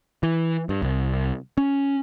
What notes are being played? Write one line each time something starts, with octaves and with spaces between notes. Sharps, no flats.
E3
G2
C2
C#4